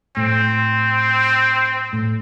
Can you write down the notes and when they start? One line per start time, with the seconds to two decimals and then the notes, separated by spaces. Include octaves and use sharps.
0.17 A2 C4
1.93 A2